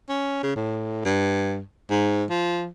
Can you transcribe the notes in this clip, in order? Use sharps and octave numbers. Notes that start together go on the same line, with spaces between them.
C#4
C#3
A2
G2
G#2
F3